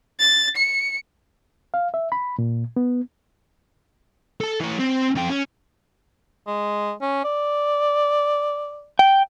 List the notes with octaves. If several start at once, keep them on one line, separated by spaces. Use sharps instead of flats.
A6
C#7
F5
E5
B5
A#2
B3
A4 A5
E3 C#5
C4
F2 G5
C#4
G#3
C#4
D5
G5